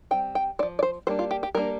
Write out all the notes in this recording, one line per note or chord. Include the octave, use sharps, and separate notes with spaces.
G3 C4 G5
G5
C4 D5
F3
D5
C5
G3 A#3 D4 C5
F4
G4
G4
G3 A#3 D4 A#4